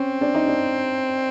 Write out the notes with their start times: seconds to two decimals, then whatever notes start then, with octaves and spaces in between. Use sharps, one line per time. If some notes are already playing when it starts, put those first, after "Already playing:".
Already playing: C4 C#4
0.21 D4
0.35 D#4
0.47 D4